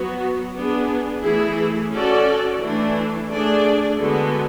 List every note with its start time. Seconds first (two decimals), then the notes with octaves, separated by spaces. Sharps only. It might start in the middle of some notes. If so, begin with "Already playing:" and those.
Already playing: F#3 B3 F#4
0.53 B3 D4 G#4
1.22 E3 A3 E4 G#4
1.92 C#4 F#4 A4 D5
2.61 E3 A3 D4
3.30 A3 D4 G#4 D5
3.99 D3 G#3 B3 F#4 A4